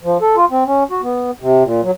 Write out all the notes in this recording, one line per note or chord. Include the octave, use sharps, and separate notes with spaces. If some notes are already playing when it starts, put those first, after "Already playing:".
F3
A4
F4
C4
C#4
F#4
B3
C3
A#2
F#3